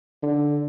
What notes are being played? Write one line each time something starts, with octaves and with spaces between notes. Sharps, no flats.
D3